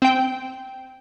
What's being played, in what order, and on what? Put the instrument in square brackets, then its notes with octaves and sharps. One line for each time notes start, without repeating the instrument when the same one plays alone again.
[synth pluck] C4 G5